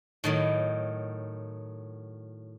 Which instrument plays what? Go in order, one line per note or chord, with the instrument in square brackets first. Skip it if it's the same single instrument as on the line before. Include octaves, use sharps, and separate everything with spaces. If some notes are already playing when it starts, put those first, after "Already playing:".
[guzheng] A2 D#3 F#3